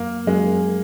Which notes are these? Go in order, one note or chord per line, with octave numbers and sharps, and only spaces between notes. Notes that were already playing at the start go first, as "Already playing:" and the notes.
Already playing: F#2 A#3
F#2 G#3